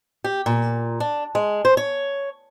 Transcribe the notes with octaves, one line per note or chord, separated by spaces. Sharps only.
G4
A#2
D4
G#3
C5
C#5